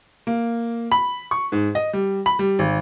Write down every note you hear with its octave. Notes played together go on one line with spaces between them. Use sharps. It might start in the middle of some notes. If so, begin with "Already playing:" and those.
A#3
B5
C#6
G#2
D#5
G3
B5
G3
G#1